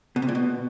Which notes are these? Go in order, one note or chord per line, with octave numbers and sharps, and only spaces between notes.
B2
C3
A#2
B2